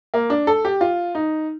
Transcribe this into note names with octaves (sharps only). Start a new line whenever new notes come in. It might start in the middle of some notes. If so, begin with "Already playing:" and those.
A#3
D4
A4
G4
F4
D#4